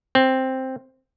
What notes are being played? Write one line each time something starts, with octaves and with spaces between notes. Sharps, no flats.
C4